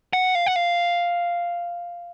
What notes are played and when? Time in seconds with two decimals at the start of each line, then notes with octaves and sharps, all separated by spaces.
0.13 F#5
0.35 F5
0.46 F#5
0.56 F5